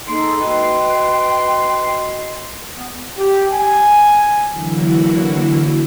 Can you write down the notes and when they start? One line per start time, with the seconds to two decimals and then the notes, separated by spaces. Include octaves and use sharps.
0.08 A#3 D#4 G#4 A4 C6
0.39 F#4 B4 D#5 G5 B5
2.76 B3
3.18 G4
3.53 G#5
4.51 D3 E3 F#3 A#3 E4 F#4